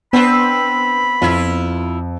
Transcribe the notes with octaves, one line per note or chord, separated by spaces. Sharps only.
B3 C4 D4 B4 B5
F2 E4 F4